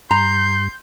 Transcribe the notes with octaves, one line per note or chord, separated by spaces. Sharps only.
G2 A#5 C6 G6